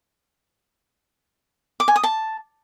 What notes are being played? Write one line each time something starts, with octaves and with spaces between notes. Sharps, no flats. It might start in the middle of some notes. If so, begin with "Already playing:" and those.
D6
G#5
D#6
A5